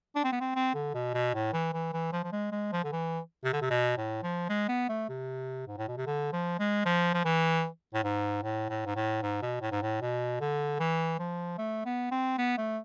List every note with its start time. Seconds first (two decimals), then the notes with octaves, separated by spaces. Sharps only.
0.16 D4
0.24 C4
0.32 B3
0.41 C4
0.56 C4
0.74 D3
0.95 B2
1.14 B2
1.34 A2
1.53 E3
1.73 E3
1.93 E3
2.13 F3
2.24 F3
2.32 G#3
2.52 G#3
2.73 F3
2.84 D3
2.92 E3
3.45 C3
3.53 D3
3.62 C3
3.71 B2
3.97 A2
4.23 F3
4.49 G#3
4.69 B3
4.89 A3
5.09 C3
5.68 G#2
5.78 A2
5.88 B2
5.97 C3
6.06 D3
6.33 F3
6.59 G#3
6.86 F3
7.14 F3
7.25 E3
7.94 A2
8.04 G#2
8.43 A2
8.70 A2
8.86 G#2
8.96 A2
9.23 G#2
9.42 B2
9.61 A2
9.72 G#2
9.82 A2
10.01 B2
10.41 D3
10.80 E3
11.19 F3
11.58 A3
11.85 B3
12.12 C4
12.38 B3
12.58 A3